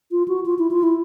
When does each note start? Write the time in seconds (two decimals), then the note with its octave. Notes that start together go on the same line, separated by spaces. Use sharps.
0.11 F4
0.28 F#4
0.46 F4
0.59 E4
0.71 F4
0.83 E4